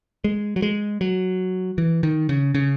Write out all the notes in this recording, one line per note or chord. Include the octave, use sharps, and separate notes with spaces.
G#3
F#3
G#3
F#3
E3
D#3
C#3
C#3